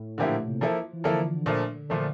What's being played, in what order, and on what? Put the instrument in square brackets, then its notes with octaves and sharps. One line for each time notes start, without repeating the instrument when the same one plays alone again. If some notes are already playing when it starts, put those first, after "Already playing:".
Already playing: [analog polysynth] A2
[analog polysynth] A#2 [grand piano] D3 F3 A#3 E4 G4
[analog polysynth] A#2
C3
[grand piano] F3 A#3 E4 A4
[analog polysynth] F3
E3
[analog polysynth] D3 [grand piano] F3 A#3 E4 A4
[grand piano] A#2 F3 A3 [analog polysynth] D3
[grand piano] A#2 F3 A3 [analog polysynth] D3